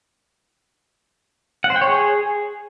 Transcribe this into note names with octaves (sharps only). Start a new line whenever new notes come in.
F#5
C5
G5
C#5
G#4